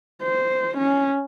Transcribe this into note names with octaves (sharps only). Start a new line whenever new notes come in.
C5
C#4